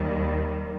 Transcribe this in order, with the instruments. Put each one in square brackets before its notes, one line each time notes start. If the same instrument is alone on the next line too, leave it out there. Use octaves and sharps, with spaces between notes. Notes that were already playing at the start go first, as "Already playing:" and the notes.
Already playing: [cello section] D#2 D#3 G3